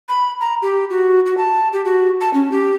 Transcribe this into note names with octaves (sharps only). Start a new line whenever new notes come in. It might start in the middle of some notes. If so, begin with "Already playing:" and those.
B5
A#5
G4
F#4
F#4
A5
G4
F#4
A5
C#4
G4